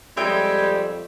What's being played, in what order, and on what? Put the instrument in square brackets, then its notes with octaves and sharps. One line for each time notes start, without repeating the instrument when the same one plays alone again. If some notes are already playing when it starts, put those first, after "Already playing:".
[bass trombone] F2 [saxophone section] G3 [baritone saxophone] G#3 [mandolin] C#5 E5 G5